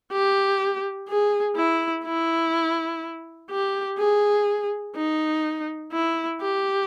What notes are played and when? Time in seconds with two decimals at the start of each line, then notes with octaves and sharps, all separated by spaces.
0.12 G4
1.09 G#4
1.56 E4
2.05 E4
3.50 G4
3.98 G#4
4.96 D#4
5.92 E4
6.41 G4